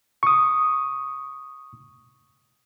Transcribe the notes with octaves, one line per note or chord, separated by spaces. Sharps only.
C#6 D#6